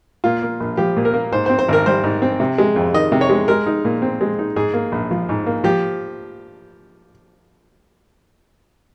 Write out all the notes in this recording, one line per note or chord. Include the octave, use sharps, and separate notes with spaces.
A#2 F4
A#3
A#1
F3 G4
A#2
A#4
A#3
G#2 C5
C4 C5
C5
G#1 A#4
G3 C5
G#2
C4
C3
G#3
F2
D#3 D#5
C3
C#5
G#3
G#3 A#4
D#4
A#2
C4
G#3
D#4
G#2 G#4
A#3
A#1
F3
G#2
A#3
F3 G4